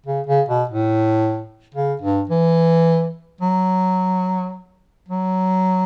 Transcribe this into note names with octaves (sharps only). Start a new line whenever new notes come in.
C#3
C#3
B2
A2
C#3
G2
E3
F#3
F#3